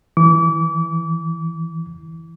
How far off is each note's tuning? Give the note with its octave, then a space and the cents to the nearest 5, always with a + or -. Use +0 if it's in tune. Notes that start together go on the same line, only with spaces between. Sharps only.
E3 +0 D6 -35